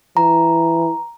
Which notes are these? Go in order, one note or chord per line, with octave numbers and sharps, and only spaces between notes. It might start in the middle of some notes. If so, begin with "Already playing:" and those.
E3 A#5